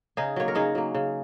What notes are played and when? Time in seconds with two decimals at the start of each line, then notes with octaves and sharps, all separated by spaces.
0.17 C#3 D#4 G#4
0.36 F#3 A#3 C#5
0.48 A#4
0.55 C#3 D#4 G#4
0.75 F#3 A#3
0.94 C#3